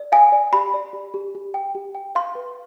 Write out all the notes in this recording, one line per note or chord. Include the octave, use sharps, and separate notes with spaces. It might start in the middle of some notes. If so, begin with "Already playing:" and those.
Already playing: D5
F5 G#5
D5
G4 B5
D5
G4
G4
G4
G5
G4
G5
F5 C6
B4